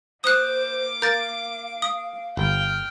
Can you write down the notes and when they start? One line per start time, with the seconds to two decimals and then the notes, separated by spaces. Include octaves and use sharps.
0.24 A#3 C5 D6 D#6 F#6
1.02 A#4 F5 G6 A6
1.82 D#6
2.37 G1 G5 F6